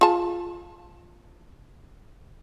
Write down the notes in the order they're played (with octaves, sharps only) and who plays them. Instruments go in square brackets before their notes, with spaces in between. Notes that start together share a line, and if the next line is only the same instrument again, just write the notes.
[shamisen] F4 G#4 A5